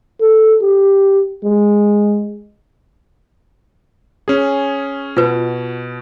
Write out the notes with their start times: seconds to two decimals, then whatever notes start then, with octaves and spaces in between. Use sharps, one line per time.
0.21 A4
0.62 G4
1.44 G#3
4.28 C#4 G#4
5.17 B2 F4 B4